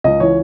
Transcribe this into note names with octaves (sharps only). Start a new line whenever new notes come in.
C#2 D#5
E3 C#5